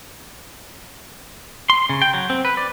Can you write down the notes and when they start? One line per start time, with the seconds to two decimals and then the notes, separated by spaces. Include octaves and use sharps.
1.70 C6
1.89 C#3
2.02 G5
2.14 F#3
2.30 C4
2.45 B4
2.57 D5